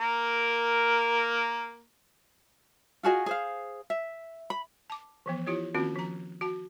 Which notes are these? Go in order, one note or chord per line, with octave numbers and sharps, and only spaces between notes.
A#3 A#4
F4 F#4 G#4 D#5
G#4 C5 F5
E5
B5
A5 D6
E3 F3 B3
E4 F4 G4 C#5
D#3 A#3 C4 C#4 F4 F#4
F3 A#5
F#4 A5